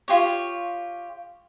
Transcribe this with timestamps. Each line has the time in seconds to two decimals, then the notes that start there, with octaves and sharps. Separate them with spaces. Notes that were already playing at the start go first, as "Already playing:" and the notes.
0.08 F4 G4 C#5